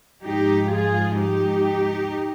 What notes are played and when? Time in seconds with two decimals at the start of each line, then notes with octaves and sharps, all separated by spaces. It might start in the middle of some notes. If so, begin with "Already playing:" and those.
0.23 G#2 F3 G#3 D#4 G4
0.71 F4 G#4
1.20 D#4 G4